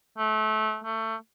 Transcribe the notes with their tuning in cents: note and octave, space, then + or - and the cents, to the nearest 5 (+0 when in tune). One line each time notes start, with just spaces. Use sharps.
A3 -25
A3 +25